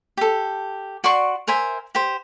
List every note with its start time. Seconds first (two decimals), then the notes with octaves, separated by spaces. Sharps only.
0.17 G4 A4
1.04 F#4 D5 C6 C#6
1.47 A#4 C5 E5 G#5
1.95 G4 C5